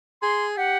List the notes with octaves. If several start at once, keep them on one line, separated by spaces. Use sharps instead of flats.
G#4 C6
G4 F#5